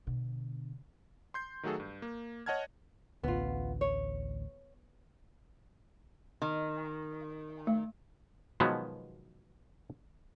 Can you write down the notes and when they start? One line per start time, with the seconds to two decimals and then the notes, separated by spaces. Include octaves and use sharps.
0.07 B2 D3
1.34 C6 G6 C7
1.63 D#3 F#3 A3 F#4 G#4 A4
1.80 G2
2.02 A#3
2.46 C#5 D#5 F#5 A5 F6 G#6
3.24 A1 D2 B3 F4
3.81 C#5
6.42 D#3
7.67 A3
8.60 B2 D#3 F3 F#3 G#3 B3